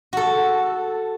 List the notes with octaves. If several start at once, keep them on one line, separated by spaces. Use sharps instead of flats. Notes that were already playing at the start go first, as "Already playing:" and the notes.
F#4 A4